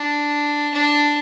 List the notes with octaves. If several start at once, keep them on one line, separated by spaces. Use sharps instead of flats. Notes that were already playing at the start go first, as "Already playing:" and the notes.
Already playing: D4
D4